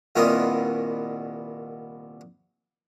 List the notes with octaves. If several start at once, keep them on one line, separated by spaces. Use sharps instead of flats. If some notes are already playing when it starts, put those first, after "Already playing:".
C2 A#2 D#3 B3 F4 D#6